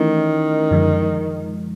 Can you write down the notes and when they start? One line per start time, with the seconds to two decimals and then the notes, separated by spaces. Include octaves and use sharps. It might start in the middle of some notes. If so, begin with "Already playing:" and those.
Already playing: D#3 E3 A3 C#4 E4
0.71 F#2 D3 F3 G#3